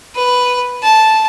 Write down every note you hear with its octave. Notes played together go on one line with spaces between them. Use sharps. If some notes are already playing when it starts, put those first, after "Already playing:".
B4
A5